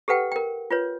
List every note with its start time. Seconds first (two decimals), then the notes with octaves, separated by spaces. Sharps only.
0.08 G4 A4 B4 F#5 G5
0.32 A#4 G5
0.70 F4 B4 C#5